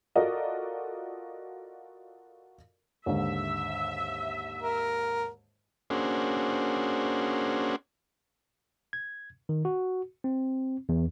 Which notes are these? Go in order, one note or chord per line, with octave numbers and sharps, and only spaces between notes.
F4 F#4 A4 A#4 D5 D#5
D#2 G#2 D3 E5
A#4
A#3 C#4 D4 F#4 G#4 C5
G#6
D#3
F#4
C4
E2